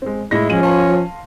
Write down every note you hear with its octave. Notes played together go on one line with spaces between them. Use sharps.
G#3 C4
A2 G#3 E4 A#6
F3 C#4 F4 D#7 F#7
C#5 F5 A5 C6